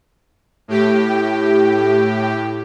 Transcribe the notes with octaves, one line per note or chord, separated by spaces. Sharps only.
A2 G4